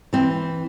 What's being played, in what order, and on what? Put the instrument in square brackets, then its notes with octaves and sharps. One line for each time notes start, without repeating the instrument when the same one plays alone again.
[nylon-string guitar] E3 C4